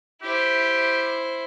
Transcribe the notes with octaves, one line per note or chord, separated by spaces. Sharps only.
E4 G4 C5